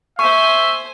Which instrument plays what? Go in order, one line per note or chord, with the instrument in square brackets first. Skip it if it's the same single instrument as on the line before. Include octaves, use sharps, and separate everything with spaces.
[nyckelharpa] C5 G#5 [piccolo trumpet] E5 [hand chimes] C#6